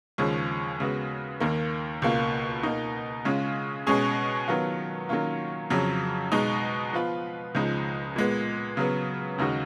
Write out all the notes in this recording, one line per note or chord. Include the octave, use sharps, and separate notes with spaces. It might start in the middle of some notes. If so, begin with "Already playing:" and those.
D#2 C#3 F3 G#3 C#4
C#3 G#3 B3 F#4
D#2 D#3 A#3
C#2 B2 A#3 F4
B2 A#3 D#4
C#3 G#3 C#4 F4
B2 G#3 C#4 G#4
D#3 F#3 B3 F4
D#3 F#3 A#3 C#4 F4
F2 C#3 F#3
B2 G#3 D#4
F3 B3 F4 B4
C#2 C#3 F3 G#3 D#4
A#2 G#3 B3
C#3 F#3 B3
D#2 C#3 G#3 D#4 F#4